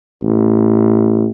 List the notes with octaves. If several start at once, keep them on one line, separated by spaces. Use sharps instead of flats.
A1